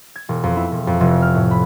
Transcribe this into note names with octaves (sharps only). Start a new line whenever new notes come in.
G#6
E1
F2
E4
E1
F2
F1
F6
A2
B5